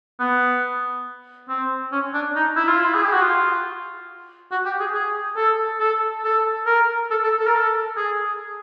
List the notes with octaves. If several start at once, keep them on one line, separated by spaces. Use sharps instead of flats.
B3
C4
C#4
D4
D#4
E4
F4
E4
G#4
G4
F#4
F4
F#4
G4
G#4
G#4
A4
A4
A4
A#4
A4
A4
A4
A#4
A4
G#4